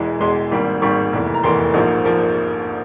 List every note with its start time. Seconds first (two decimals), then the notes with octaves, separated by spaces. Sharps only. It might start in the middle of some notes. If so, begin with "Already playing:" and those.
Already playing: E1 E2 E3 G#3
0.20 E1 E2 E3 G#3 C6
0.51 G#1 G#2 G3 A#3
0.82 G#1 G#2 G3 A#3 C#6
1.13 F1 E2 E3 A#3
1.34 A#5
1.43 F1 E2 E3 A#3 C6
1.74 A#1 G#2 F3 A#3
2.05 F3 A#3